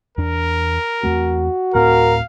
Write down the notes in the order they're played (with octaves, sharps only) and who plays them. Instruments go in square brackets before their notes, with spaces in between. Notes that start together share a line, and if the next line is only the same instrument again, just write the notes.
[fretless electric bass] E2 D4 [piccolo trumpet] A#4
[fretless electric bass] E2 A3 C4 [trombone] F#4
[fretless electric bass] D1 A2 C4 [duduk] A#4 [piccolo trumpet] F5